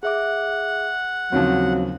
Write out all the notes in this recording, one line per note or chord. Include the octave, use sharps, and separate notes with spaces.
G#4 E5 F#5 D6
D#2 C#3 F3 F#3 C4 F5